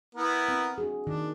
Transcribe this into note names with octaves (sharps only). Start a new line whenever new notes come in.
B3 E4 A#4
C4
D4 F#4 G#4
D#3 D4